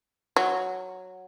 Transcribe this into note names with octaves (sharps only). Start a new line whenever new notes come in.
F#3